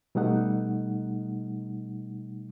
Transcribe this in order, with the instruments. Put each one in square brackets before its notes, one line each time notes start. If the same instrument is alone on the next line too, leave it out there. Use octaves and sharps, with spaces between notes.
[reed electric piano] B2 G3 A3 D#4 F#5